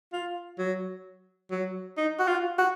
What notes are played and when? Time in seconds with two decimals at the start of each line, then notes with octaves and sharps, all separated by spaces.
0.13 F4
0.58 F#3
1.51 F#3
1.97 D#4
2.19 F#4
2.27 F4
2.59 F#4